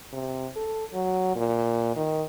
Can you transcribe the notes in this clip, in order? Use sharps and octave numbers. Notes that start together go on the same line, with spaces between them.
C3
A4
F#3
A#2
D#3